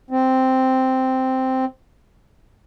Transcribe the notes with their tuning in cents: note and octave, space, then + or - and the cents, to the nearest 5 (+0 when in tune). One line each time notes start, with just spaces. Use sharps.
C4 -5